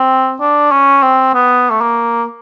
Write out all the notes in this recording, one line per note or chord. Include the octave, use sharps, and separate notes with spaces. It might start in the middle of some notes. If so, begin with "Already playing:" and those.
Already playing: C4
D4
C#4
C4
B3
A3
A#3